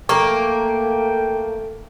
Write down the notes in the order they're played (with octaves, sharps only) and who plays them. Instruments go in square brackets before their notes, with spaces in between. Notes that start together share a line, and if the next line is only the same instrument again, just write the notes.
[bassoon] A3 [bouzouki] A#3 [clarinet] G5 [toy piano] C#6